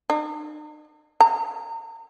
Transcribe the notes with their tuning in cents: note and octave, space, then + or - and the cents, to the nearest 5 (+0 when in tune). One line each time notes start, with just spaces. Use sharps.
D#4 -45
A#5 -40